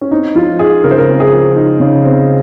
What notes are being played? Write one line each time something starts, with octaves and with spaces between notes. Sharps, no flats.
C#4
C4 D#4
F3 F4
D#4 G#4
C#3 A#4
C5
A#4
C4
G#4
F3
D#4
C#3
C4